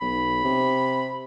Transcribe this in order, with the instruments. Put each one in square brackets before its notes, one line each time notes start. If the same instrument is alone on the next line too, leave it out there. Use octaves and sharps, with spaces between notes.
[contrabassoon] B1 [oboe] B5
[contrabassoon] C3